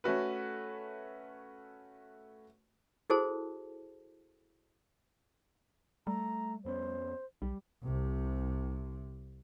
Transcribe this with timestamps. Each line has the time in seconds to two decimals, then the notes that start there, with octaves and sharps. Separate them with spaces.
0.04 A3 C#4 F#4 B4
3.10 E4 F#4 G#4 A4 C5 A5
6.07 G3 A3 A#5
6.65 F2 B3 C#4 C5
7.42 B1 G3
7.84 C2 C3